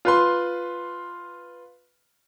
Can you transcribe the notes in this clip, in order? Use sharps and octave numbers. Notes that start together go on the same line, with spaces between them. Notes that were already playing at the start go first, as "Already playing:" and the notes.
F4 B4 C6